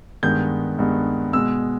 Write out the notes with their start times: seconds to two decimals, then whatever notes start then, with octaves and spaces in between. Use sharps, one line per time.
0.23 G2 D#3 G#3 B3 G6
0.79 G2 D#3 G#3 B3
1.33 B2 G#3 B3 E6